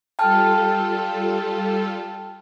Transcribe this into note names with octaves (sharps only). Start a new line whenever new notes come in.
G3 F4 A4 G5 A5 F6